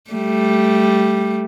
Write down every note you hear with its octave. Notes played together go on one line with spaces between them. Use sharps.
G3 A3